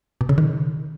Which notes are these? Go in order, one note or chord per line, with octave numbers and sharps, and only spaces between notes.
B2
C#3
D#3